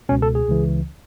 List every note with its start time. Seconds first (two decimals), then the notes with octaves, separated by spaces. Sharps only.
0.09 C#2 B2 C#4
0.22 A4
0.35 G#4
0.48 C#2 C#3 E3